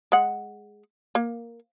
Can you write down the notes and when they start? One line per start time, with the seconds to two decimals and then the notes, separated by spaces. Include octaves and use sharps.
0.12 G#3 F#5
1.15 A#3